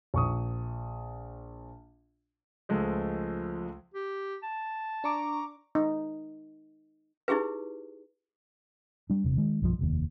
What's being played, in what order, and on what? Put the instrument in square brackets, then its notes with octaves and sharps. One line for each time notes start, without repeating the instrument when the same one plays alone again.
[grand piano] A#1 C#6 D#6
[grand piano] C#2 G#3 A3 [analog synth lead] F3
[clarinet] G4
A5
[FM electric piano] D4 C#6 D6 [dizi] A#5
[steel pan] D#4
[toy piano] D#4 E4 G4 G#4 B4
[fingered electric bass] G3 D4
E1 C3
D#3 G#3
B1 G2 D#3 F3
F1 D#2